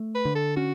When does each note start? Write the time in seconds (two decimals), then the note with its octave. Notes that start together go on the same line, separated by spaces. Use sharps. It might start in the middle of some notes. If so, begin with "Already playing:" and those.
Already playing: A3
0.15 B4
0.25 D3
0.35 A4
0.56 C#4 F#4